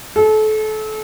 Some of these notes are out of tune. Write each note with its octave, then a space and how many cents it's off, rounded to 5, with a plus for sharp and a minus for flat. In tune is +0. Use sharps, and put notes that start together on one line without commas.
A4 -30